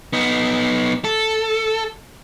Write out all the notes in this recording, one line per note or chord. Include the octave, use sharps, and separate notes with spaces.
B3 D#4
A4